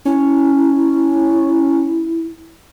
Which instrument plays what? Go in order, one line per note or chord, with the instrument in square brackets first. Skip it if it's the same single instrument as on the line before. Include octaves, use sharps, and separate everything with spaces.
[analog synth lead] C#4 [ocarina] E4